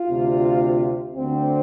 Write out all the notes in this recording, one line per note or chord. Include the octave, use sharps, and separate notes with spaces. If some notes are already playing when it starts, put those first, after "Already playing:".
Already playing: F4
D2 C3
D2 D3 C4